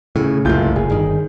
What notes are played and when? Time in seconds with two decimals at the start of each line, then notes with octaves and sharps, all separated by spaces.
0.16 A2 C#3
0.45 F#1 C2 A2 F4 G6
0.76 F#1 G#4
0.90 G1 D#3